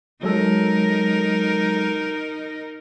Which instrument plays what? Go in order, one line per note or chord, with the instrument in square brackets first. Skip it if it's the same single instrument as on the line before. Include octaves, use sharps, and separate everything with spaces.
[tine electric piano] F#3 G#3 A4 [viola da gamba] D#4 A#4